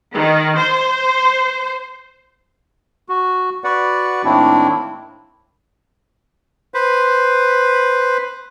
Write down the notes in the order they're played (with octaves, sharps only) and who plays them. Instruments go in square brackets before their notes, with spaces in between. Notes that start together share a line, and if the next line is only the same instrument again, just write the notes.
[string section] D#3
C5
[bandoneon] F#4
F#4 B4 D5 F#5
A2 D#3 A#3 C4 D4 E4
[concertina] B4 C5